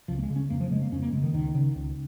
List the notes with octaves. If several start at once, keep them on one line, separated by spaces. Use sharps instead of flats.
C#2 F3
A#3
G#3
C#3
C#4
F2 A#3
F3
C#3 G#3
A#3
F2 C#4
A#3
C#3 G#3
D#3
C#2 D#3
C#3
C#2